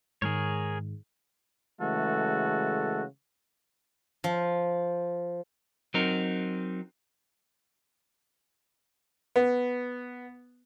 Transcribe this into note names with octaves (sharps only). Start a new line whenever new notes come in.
G#2 D#3 G#3 G#4 A#4 C#5
C#3 E3 G#3 A3 F#4 A4
F3
F#3 C4 D#4 A#4
B3